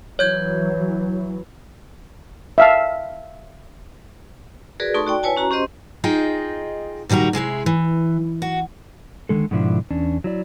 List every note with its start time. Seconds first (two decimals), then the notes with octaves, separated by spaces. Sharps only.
0.19 E3 F#3 C#5 G6 G#6
2.58 E5 F5 A5
4.80 F#4 G#4 A#4 B4 D5
4.94 A3 D#4 A4 A5 C6 C#6
5.07 F#4 D5 G5
5.23 E4 B4 C#5 G#5 A5
5.37 C#4 F#4 A#5
5.51 C#4 G4 C5 D#5 C6
6.04 D#4 F4 G#4 D#5 G5
7.09 A#2 D#3 G3 F#4 A#5
7.33 C3 G#3 E4 G#4
7.66 E3
8.42 F#4
9.29 D3 D#3 G#3 A4
9.51 G#2 B2 D3 F3 D4 E4
9.91 E2 C#4 D4
10.24 F#3 E4 D5